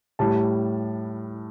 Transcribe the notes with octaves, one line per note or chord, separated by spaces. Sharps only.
A2 G3 A5